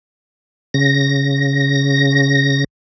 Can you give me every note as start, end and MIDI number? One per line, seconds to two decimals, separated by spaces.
0.74 2.64 49
0.74 2.64 94